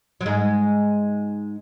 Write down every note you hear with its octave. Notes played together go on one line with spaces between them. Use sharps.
F#3
G#2 G#3